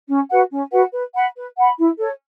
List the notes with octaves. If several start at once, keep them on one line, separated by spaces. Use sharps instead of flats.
C#4
F#4 B4 F#5
C#4
F#4 B4 F#5
B4
F#5 B5
B4
F#5 B5
E4
A4 C#5